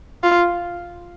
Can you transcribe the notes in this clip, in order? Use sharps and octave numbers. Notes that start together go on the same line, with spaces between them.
F4